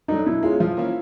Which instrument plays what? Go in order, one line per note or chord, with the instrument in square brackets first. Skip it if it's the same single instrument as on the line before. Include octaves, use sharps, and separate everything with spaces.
[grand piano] F#3 A3 D4 [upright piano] D#4
[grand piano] B2 [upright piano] E4
[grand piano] G#3 C#4 [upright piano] F4
[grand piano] F3 [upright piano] F4
[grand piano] A#3 C#4 E4